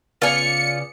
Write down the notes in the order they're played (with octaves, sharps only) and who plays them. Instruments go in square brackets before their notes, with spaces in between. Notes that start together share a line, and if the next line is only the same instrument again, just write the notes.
[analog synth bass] C#3 [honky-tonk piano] B3 D5 [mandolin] F4 G#5 [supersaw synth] C#7